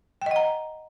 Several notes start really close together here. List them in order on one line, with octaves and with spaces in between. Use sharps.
G5 D#5 F#5 A#5